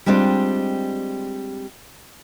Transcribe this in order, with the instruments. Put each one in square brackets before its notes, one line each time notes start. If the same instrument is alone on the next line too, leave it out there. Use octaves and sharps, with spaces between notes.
[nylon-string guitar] G3 G#3 C4 D4 F4